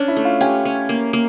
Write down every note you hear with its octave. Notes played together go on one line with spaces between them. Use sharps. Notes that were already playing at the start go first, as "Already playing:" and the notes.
Already playing: C#4 D4
E4
A3
F4
C#4 G4
C#4
A#3
A#3